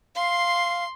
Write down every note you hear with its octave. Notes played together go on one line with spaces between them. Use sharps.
F5 C6